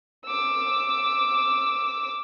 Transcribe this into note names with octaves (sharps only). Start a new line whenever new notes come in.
D6 E6